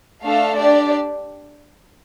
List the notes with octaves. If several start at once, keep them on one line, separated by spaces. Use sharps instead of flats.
A3 D4 A4 F5
D4 G4 D5